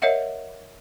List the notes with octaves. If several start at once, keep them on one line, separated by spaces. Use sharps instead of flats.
A#4 C#5 D#5 E5 F#5